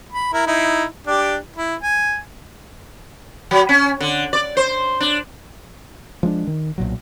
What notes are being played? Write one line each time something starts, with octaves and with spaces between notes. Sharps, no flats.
B5
E4 A#4
D#4 E4
D4 G4
E4
G#5
F#3
C#4
D3
D5
C5
D4
F3 G#3 C#4 D4
D#3
B1 A#2 F#3